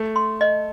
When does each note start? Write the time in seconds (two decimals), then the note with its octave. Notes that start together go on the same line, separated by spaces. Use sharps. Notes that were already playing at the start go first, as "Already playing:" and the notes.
Already playing: A3
0.16 C6
0.41 D#5